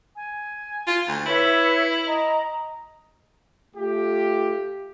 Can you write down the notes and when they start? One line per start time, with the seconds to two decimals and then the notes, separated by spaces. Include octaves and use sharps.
0.14 G#5
0.87 F4
1.08 D2
1.26 E4 B4 C#5 E5
2.06 D#5 A#5
3.76 A3 F4 G4